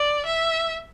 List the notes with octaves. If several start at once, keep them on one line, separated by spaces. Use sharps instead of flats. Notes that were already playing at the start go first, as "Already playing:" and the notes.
Already playing: D5
E5